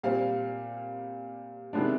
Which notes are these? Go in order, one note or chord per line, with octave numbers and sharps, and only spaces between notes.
A#2 G3 C4 F5
C3 D#3 G#3 B3 D4